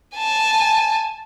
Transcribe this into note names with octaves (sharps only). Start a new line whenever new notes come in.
G#5 A5